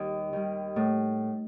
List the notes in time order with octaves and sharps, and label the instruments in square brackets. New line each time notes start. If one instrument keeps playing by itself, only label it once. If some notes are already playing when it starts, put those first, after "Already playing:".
Already playing: [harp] D#2 D#3 G3 D#4
D#3 G3
A2